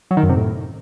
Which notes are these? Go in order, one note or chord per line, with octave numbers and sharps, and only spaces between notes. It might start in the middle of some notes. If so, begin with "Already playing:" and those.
F#3
D#3
F#2
C3
A2